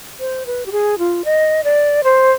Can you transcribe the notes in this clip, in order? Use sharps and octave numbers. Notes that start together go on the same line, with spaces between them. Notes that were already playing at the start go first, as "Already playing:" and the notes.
C5
B4
G4
G#4
F4
D#5
D5
C5